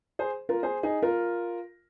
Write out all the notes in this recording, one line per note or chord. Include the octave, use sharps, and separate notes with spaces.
G#4 C5
F4 A#4
G#4 C5
D#4 G#4
F4 A#4